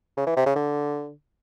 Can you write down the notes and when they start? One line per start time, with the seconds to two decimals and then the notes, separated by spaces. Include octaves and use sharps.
0.17 C#3
0.27 E3
0.36 C3
0.46 C#3
0.56 D3